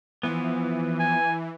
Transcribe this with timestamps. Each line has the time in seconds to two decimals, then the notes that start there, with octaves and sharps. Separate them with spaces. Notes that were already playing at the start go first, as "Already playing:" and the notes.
0.23 E3 F3 B3
1.00 G#5